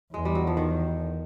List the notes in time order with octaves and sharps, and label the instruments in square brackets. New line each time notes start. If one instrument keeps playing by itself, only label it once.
[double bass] E2 [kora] G#3
[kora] G3
F#3
F3
D#3